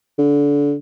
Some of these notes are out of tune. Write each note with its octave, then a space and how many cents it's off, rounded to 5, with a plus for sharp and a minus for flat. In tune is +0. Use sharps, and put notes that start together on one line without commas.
D3 -25